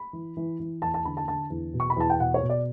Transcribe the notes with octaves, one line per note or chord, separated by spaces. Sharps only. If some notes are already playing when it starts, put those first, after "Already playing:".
Already playing: B5
E3
E3
E3
E2 A5
A5
D3 B5
A5
D3 A5
E2
B2
C#6
B5
E2 A5
G5
B2 F#5
C#5
B2
D5